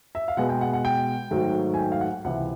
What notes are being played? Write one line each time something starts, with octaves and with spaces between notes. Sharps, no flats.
E5
F5
B2 G#3 B3 F#5
G5
F#5
F#5
G5
G#2 D#3 F#3 A3
G#5
G5
F5
F#5
C#2 C3 E3 F#5